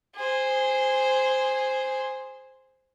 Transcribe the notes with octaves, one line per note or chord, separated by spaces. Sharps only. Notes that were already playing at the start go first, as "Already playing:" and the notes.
G#4 C5